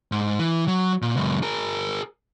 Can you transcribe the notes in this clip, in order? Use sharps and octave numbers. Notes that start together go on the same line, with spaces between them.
G#2
E3
F#3
A#2
C#2 F#2
G#4 A#4